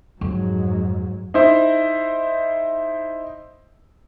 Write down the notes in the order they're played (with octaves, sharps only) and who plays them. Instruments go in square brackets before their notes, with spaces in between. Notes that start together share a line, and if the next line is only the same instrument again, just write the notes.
[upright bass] F2 [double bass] G#2 F#3
[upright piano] D#4 E4 C5